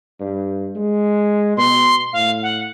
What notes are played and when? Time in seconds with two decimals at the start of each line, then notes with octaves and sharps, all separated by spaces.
0.20 G2
0.75 G#3
1.57 B2 C6
2.13 A2 F5
2.42 F#5